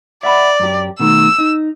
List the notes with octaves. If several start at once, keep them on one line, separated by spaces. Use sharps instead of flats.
D5 E5 F#5 B5
F#2 G4
B2 D#3 A3 E6
D#4